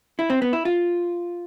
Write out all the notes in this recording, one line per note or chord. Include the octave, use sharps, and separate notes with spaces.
E4
C4
B3
E4
F4